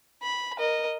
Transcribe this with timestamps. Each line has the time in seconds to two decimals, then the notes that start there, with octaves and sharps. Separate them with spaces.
0.22 B5
0.58 A#4 D#5